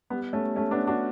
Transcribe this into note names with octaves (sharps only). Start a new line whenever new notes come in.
G3 B3
A3 C#4
A3 C#4
B3 D4
D4 F#4